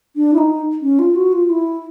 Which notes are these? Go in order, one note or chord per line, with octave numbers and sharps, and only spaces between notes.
D4
E4
D#4
C#4
F4
F#4
F4
E4